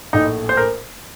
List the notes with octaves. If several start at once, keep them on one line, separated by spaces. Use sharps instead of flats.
A#1 A2 A3 D#4
C5
A#4